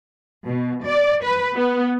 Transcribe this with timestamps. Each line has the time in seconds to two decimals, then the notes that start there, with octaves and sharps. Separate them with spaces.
0.46 B2
0.84 D5
1.23 B4
1.56 B3